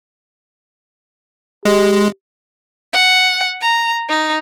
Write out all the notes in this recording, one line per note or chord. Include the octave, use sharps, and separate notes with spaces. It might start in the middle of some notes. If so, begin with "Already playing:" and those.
G#3 G4
F#5
A#5
D#4